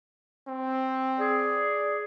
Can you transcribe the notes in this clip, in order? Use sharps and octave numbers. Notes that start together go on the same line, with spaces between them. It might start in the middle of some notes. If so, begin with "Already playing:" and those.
C4
G#4 D5